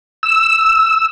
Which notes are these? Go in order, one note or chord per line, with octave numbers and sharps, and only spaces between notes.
E6